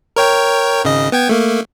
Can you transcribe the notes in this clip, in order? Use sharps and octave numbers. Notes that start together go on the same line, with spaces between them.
A#4 C#5 G5
G#1 C#3 D#5
B3 G5 G#6
A3 A#3